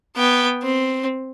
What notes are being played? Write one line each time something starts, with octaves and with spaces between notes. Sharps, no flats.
B3 G5
C4